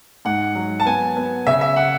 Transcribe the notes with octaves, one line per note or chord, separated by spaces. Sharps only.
G#2 F#5
F#3
A5
B3 G#5
B3
C#3 E5
E5
F#5